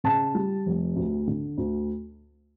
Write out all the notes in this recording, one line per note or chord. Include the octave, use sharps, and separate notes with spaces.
C#3 A5
G3
F1
D2
D3
D2